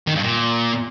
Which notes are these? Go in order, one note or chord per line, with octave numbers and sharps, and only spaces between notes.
D#3
G2
A#2